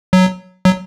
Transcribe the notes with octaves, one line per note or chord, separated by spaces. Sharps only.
F#3
F#3